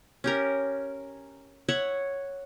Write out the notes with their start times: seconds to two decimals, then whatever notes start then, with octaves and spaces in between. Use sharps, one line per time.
0.24 C#4 G4 A#4
1.68 C#5 E5 F#5